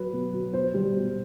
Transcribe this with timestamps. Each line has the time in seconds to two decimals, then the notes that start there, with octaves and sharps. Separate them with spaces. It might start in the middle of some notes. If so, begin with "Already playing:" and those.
Already playing: F#3 B4
0.13 B2
0.33 F#3
0.53 B2 C5
0.74 G3
0.95 B2